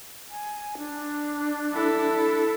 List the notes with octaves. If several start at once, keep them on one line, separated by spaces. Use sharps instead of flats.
G#5
D4
E4 A4